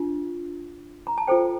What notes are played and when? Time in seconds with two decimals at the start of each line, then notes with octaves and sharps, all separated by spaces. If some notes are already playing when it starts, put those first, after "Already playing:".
Already playing: D4 F4
1.07 A#5
1.18 A5
1.27 F4 A4 C5 G5